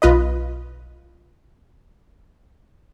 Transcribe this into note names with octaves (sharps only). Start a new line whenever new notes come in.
B1 F4 B4 D#5